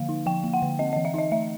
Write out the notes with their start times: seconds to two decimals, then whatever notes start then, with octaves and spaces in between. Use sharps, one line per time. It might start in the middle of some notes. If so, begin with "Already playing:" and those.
Already playing: D3 F3 A#3 F5
0.09 D#4
0.26 F3 G5
0.44 A#3
0.54 F#5
0.62 D3
0.79 C4 D#5
0.93 E3 D#5
1.05 E5
1.14 D#4 D#5
1.32 A3 E5